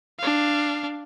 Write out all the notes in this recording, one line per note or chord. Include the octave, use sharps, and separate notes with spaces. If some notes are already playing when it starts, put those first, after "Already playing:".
D4 F5